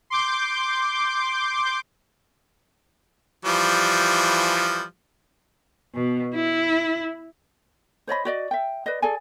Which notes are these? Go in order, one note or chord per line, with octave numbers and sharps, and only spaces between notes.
C6 D6 G6
E3 F3 G3
B2
E4
C5 C#5 D#5 B5
F#4 D5 D#5
E5 G5
B4 D5 D#5
G#4 A4 D5 G#5